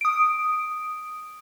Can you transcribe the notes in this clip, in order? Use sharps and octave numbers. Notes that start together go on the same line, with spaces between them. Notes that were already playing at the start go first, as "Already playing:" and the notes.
D#6 D7